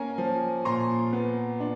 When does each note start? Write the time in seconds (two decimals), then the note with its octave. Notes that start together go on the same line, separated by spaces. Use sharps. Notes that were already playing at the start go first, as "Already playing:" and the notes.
Already playing: A#3 C#4 G#5 A#5
0.18 F3
0.65 A#2 A#5 C6
1.13 B3
1.60 D4